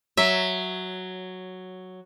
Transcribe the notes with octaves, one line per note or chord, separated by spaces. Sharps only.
F#3 E5